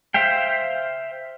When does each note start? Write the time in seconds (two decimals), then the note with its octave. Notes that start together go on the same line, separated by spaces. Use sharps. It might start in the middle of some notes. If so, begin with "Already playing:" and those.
0.14 C5 E5 F5 G5